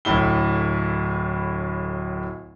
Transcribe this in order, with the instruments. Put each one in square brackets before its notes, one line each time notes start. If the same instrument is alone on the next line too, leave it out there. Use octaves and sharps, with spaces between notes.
[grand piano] D1 A2 E4 G7